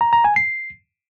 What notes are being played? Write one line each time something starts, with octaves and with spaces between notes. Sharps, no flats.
A#5
A#5
G#5
C7